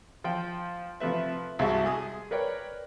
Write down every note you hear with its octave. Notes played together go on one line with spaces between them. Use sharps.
F3 G5
C3 F3 A3 B4 E5
C2 G#3 F#4 E5 A5
G#3 G#4 D#6
A#4 B4 C#5 D5 G5